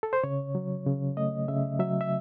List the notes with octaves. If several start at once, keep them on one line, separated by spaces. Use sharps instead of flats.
A4
C5
C#3 C#5
F#3
C#3
A3 D#5
C#3 E5
F#3 E5
E5